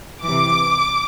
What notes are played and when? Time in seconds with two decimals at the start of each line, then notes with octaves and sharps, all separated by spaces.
0.25 C3 E3 D6